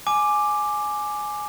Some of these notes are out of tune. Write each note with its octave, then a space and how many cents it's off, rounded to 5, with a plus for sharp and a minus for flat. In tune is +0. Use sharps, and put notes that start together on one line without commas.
G#5 +10 D6 +5